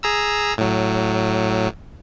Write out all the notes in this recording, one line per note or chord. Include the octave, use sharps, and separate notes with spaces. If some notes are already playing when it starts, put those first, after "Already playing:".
G#4 A#5 E6
A2 F#3